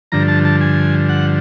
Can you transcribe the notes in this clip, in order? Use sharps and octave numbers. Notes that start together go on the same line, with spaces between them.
G2 D3 F3 A#5
A5
A5
G#5
F#5